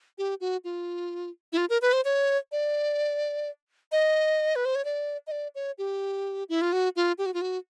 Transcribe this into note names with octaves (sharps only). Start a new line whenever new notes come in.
G4
F#4
F4
E4
F4
A#4
B4
C5
C#5
D5
D#5
B4
C5
C#5
D5
D#5
D5
C#5
G4
E4
F4
F#4
F4
G4
F#4
F4
F#4